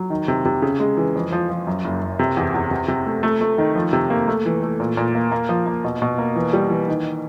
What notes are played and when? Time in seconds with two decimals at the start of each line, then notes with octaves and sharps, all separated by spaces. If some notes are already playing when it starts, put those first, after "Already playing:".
Already playing: F#3
0.10 D#3
0.28 C3
0.45 C3
0.62 C#3
0.80 G#3
0.97 E3
1.15 F2
1.32 F3
1.50 F3
1.67 F#2
1.84 F#1
2.02 F#1
2.19 C3
2.37 E2
2.54 E2
2.71 C3
2.88 C3
3.06 A3
3.23 A3
3.41 A3
3.58 D#3
3.75 F3
3.93 C3
4.10 A#3
4.28 A3
4.46 E3
4.63 A3
4.80 A#2
4.97 A#2
5.15 A#3
5.31 A#3
5.49 F3
5.66 A#3
5.84 B2
6.02 B2
6.18 A#3
6.36 E3
6.53 G3
6.70 E3
6.88 D#3